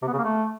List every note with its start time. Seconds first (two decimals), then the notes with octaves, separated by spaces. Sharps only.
0.02 C3
0.08 B3
0.13 C#3
0.19 A#3
0.24 A3